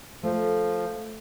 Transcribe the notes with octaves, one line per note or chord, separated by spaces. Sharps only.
F3 A3